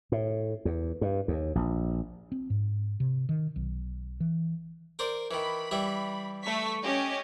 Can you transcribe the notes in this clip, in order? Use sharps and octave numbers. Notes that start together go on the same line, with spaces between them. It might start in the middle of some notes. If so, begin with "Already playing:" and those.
A2
E2
G2
D#2
A#1
C4
G#2
C3
D#3
B1
E3
A#4 C5 D5
D#3 E3 B5
E3 G3 E5
A3 C#6 B6
C#4 G4 D#5